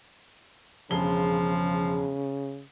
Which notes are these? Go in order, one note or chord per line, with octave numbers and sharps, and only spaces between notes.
E1 C#3 F3 G#4 G7